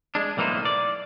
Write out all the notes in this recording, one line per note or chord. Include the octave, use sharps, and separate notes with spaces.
G#3 D4
B1 A2 E3 A#3 D#4 C5
D5